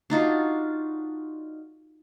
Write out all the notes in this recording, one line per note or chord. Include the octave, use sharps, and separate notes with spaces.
D4 D#4 F4 F#4